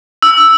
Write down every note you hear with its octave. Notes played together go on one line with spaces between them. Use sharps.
E6